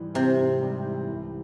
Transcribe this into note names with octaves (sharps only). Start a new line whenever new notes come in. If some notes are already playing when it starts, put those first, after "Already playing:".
Already playing: G#2 E3 G3
C3 C4
G#2
G3
E3
C2